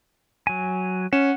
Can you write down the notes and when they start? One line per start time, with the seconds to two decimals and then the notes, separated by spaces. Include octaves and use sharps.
0.47 F#3 G#5
1.13 C#4 F#5 E7